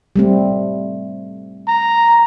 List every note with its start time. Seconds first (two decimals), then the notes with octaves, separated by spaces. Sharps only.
0.16 G3 A3 C4
1.68 A#5